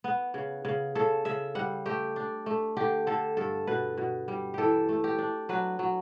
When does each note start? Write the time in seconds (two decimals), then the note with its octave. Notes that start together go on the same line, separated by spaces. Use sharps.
0.04 B3
0.34 C#3
0.65 C#3
0.95 C#3 A4
1.25 C#3 E5
1.55 G3 F#5
1.86 A3 G4
2.16 D4
2.46 A3
2.77 D3 G4
3.07 D3 A4
3.37 G2 A4
3.67 B2 B4
3.97 B2
4.28 G3
4.54 E3 G4 A4
4.89 A3
5.04 G4
5.18 D4
5.49 F#3 B4
5.79 F#3